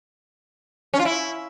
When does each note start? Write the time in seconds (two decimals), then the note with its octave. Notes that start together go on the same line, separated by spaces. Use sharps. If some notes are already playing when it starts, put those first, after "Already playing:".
0.94 C#4
0.99 F4
1.05 E4